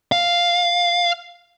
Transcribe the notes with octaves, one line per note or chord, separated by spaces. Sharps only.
F5